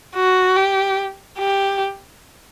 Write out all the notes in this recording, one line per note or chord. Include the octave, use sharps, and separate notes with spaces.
F#4
G4
G4